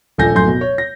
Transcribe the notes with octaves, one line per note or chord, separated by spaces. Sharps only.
D#1 A#1 A4 G#5 G6 A#6
D1 F#2 A3 G#5 C6 G6
B2
C#5
A#6